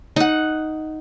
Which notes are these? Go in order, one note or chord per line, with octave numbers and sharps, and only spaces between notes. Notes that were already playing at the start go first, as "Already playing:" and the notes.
D#4 F#5